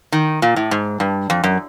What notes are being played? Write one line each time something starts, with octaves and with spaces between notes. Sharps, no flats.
D#3
A#2
A2
G#2
G2
F2
F#2